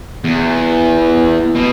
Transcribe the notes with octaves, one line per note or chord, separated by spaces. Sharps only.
E2
B2